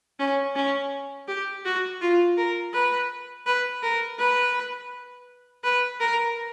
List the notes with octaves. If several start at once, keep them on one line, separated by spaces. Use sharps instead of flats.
C#4
C#4
G4
F#4
F4
A#4
B4
B4
A#4
B4
B4
A#4